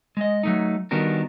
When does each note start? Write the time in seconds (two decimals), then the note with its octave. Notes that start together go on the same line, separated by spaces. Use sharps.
0.17 G#3 D#5
0.43 F#3 A3 D#4
0.91 D#3 G3 B3 D4 F#4 A#4